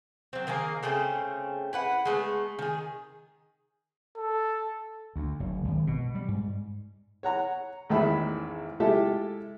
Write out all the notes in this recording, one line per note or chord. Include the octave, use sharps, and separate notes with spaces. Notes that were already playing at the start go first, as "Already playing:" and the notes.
F#3 C4
D#3 A#3 G#4 A#4
C#3 A3 C4 C#4
E4 B4 F#5
G#3 A3 B3
D#3 G#4
A4
D2
F#1
G#1
B2
G3
G#2
C#5 F#5 A#5
A1 E2 G#2 D#3 E5 B5
G#3 E4 F4 G4 A4 E5